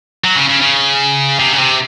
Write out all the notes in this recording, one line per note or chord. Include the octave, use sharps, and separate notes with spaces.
F#3
C#3
C#3
C#3
C3
C#3
C3